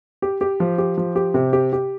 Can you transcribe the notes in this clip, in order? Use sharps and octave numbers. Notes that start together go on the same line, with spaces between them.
G4
G4
F3
G4
F3
G4
C3
G4
G4